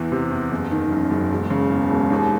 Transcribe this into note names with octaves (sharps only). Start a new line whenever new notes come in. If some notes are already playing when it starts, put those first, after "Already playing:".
Already playing: E2 E3
C3
E2
F#1
D#3
F#2
F#1
E1
C#3
E2
E1
D#2